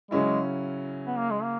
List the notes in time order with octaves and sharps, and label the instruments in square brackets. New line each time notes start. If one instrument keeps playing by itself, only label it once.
[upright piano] C#3 F#3 C#4 E4 [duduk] G#3
[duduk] B3
A#3
G#3
A#3